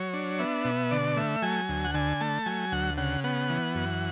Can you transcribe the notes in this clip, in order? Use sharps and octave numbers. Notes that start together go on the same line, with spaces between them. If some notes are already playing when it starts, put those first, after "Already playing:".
Already playing: F#3 C#5
D4
B3 E5
B2
D3 D5
A3 E5
F#3 G#5
D2
F#5
D3 G#5
A3 A5
F#3 G#5
D2 F#5
C#3 F#5
B3 F#5
E3
F#2